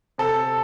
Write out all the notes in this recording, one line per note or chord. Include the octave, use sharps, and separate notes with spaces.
C3 A4